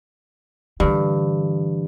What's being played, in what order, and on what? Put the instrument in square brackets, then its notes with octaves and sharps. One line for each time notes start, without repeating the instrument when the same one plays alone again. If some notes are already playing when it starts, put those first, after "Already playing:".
[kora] G2 [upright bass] D3 E3